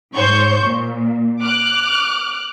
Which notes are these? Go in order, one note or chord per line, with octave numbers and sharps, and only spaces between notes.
G#2 C5 C#5 C#6 G6
A#2
D6 F6 F#6